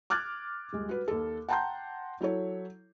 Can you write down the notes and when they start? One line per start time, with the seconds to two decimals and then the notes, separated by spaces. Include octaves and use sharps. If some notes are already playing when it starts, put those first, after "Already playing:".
0.10 D6 F6 F#6 G#6 A6
0.73 D#1 G#3
0.89 F#4 B4
1.08 D#2 A4
1.49 F#5 G5 A5 A#5 C6 G6
2.21 F#3 E4 A4 C#5